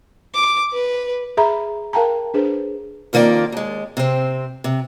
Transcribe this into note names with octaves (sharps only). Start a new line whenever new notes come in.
D6
B4
G#4 E5 A#5 B5
A#4 F5 G5 A5 A#5
D4 G#4 B4 C5
F2 D#3 A#3 F4 D5
D#2 G#3
C3 C4
C3